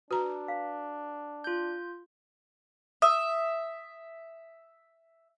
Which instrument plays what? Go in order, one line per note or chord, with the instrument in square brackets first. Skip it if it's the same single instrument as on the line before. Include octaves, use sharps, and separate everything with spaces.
[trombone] D4 [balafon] F#4 A#5 [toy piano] B4
[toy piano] F5
[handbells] F4 G6
[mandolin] E5 [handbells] D#6